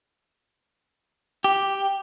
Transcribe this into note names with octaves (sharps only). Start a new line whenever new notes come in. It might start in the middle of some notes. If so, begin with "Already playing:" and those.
G4